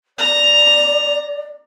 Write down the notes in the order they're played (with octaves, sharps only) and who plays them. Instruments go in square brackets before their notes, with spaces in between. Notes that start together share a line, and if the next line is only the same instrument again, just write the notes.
[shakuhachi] D5 [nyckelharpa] A#5